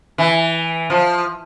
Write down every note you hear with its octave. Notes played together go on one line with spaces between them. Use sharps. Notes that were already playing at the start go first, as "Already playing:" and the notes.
E3
F3